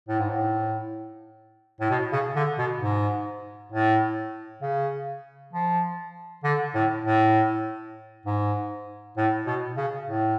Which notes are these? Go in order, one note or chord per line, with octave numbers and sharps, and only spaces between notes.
A2
G#2
A2
A2
B2
C#3
D3
B2
G#2
A2
C#3
F3
D3
A2
A2
G#2
A2
B2
C#3
A2